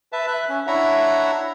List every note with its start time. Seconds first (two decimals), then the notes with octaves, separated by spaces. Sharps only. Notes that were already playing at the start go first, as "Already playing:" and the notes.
0.13 B4 E5 A5
0.27 E5 F#6
0.49 C#4
0.67 D4 E4 C#5 E5 F#5 A#5